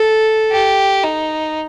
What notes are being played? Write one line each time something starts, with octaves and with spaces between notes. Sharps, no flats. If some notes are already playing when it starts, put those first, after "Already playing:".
Already playing: A4
G4
D#4